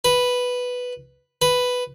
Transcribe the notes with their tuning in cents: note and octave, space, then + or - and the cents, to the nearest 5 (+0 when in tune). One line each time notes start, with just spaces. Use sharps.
B4 +0
B4 +5